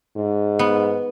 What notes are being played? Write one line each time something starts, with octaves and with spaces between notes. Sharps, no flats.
G#2
B3